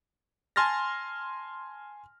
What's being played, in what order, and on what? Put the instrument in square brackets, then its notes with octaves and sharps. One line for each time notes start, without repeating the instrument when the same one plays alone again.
[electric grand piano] G#5 A5 C6 F6 A6 A#6